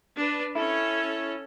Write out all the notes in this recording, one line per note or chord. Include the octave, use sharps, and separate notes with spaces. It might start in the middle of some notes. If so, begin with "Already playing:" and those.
D4 B4
C#4 E4 A4 C#5